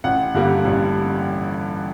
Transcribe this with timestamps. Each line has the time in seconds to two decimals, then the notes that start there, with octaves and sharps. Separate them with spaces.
0.04 A1 F#5
0.34 G2 D3 G3 A#3
0.65 A1